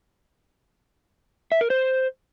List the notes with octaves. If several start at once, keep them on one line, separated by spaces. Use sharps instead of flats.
E5
A#4
C5